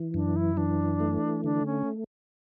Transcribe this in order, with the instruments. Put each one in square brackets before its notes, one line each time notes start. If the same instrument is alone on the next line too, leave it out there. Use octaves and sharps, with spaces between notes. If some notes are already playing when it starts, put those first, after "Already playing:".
Already playing: [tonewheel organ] E3
[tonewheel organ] F#2 [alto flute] D4
[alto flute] E4
[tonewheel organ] E3 [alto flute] D4
[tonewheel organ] A3
[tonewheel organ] D3 [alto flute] D4
[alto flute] C#4